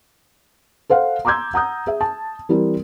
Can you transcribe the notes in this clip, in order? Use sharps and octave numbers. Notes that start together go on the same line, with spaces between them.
A4 C5 F5 F#5
A#5 C6 D6 E6 G6 G#6
F#5 A#5 D#6 G6
G#4 E5
A5
E3 G3 C4 E4 A#4